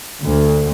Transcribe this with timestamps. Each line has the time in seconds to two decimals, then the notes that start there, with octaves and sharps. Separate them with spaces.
0.24 D2